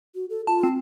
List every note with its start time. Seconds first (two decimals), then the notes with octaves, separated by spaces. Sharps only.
0.15 F#4
0.30 A4
0.47 F4 A5
0.63 C4